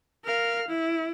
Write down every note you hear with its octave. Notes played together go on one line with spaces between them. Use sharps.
A#4 F5
E4